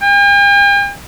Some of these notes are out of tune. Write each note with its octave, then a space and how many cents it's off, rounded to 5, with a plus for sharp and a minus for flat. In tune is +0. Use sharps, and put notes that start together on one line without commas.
G5 +45